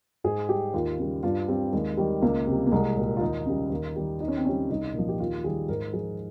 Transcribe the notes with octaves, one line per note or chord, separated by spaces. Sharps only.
G#2 G#4
G3 G4
D#2 F4
C#3 G3
G2 F4
G3 C4
D#2 G#3
D#3 G3
C#2 A#3
C3 G3
A#3
C2 G#3
A#2 G3
F4
D#2 D#4
C#3 G3
D#2
D#3 G3
D#2 D#4
C#4
C4
C#3 G3 C#4
C2 D#4
A#2 F3
G4
D#2 F4
D#3 G3 G#4
G#2 A#4
F3 G#4